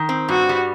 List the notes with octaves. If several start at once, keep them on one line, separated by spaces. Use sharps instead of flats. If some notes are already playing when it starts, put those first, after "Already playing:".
Already playing: D#3
C4
G2 F#4
G3